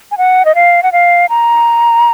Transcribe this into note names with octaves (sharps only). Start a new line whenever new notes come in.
G#5
F#5
D#5
F5
F#5
F5
A#5